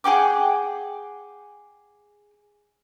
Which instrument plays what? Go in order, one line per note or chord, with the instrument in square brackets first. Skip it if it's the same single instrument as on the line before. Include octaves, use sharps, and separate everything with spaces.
[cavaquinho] G#4 F#5 G5 D6